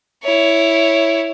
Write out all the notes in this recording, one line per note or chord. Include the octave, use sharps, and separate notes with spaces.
E4 C#5